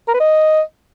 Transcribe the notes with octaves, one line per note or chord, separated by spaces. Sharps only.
A#4
B4
D#5